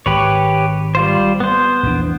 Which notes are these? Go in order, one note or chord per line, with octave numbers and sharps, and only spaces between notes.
G#1 G4 B4 C#5
G3 F4 C5
B3 C5
A#1 E2 D4